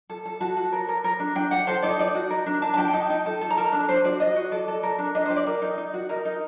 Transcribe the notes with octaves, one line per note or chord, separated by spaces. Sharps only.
A4
A4
F#4 A5
F#4
A#4
A#4
A#4
D4
D4 G5
G4 F#5
A4 C5
D#4 D5
D#4 D5
F#4
A#4
D4
D4 A5
A5
G4 G5
G5
D#4 A5
D#4
A4
A4
A#5
A#4 A5
D4
D4 C5
F#4 D5
F#4 D#5
F#4
A4 D5
A4
A#4
D4
D4 D#5
C5
G4
D5
A#4
D#4
D#4
F#4
A#4 D#5
D#4